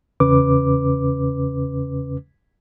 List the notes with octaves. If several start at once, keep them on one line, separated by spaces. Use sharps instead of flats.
E2 C#3 C#4 B4 D6